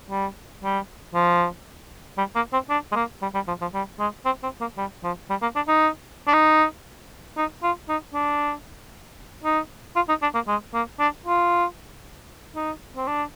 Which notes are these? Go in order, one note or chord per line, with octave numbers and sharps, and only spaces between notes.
G3
G3
F3
G3
A#3
C4
D4
G#3
A#3
G3
G3
F3
F3
G3
G#3
C4
C4
A#3
G3
F3
G3
A#3
D4
D#4
D4
D#4
D#4
F4
D#4
D4
D#4
F4
D#4
D4
A#3
G#3
A#3
D4
F4
D#4
C4
D4